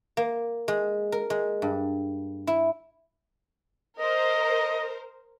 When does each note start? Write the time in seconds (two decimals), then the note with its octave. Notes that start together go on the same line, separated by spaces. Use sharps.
0.17 A#3
0.68 G#3
1.12 A#4
1.30 G#3
1.62 G2
2.47 E4
3.99 A#4 C5 D#5